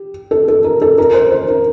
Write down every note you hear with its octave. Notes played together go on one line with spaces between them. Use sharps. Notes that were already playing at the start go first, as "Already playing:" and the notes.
Already playing: G4
A4
A4
A#4
A4
A#4
C5
C5
A#4